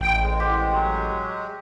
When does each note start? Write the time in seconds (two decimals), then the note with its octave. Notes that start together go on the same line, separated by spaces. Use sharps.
0.01 A1 G5
0.21 G#3
0.40 G4 C5
0.75 F#3